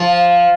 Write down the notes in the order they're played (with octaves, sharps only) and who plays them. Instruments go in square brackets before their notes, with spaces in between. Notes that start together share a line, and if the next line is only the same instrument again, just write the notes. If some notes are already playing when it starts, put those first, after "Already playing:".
Already playing: [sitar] F3